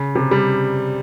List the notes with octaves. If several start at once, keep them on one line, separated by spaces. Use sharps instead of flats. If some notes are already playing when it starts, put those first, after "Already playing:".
Already playing: C#3
C3
G3